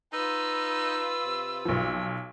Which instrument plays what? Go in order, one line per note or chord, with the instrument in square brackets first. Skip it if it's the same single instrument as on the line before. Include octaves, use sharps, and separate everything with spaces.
[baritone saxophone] D#4 [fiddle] F4 B4 [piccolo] E6
[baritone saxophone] C3
[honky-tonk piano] B1 F3